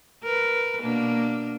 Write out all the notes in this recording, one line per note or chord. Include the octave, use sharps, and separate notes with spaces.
A#4 B4
B2 A#3 D4